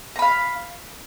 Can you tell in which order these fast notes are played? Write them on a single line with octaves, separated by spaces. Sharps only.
A#5 B5 F5